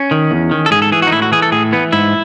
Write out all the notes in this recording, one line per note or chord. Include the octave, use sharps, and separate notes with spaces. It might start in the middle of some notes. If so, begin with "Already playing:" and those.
Already playing: C#4
D#3
E2
D#3
A4
G#2 G#4
A4
E3 G#4
F#4
D#4
A2 E4
F#4
E3 G#4
A4
A2 G#4
E3 B3
G#2 E4